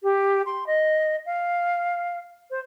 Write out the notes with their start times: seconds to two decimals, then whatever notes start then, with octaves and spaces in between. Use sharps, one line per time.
0.03 G4
0.46 C6
0.67 D#5
1.26 F5
2.50 C5